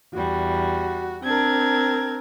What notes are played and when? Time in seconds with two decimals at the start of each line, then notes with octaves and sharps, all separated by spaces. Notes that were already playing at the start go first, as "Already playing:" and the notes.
0.14 E2 G3 F#4
1.24 C4 D4 A#4 G#6